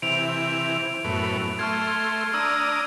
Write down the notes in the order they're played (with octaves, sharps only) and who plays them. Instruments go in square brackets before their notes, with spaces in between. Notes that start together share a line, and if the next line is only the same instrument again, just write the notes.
[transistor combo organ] C3 E3 [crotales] D7 F7
[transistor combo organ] F#2 A2 B3
[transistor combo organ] A3 C6 [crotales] C#6 F6 G#6
[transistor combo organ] D4 A#5 D#6 [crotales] E6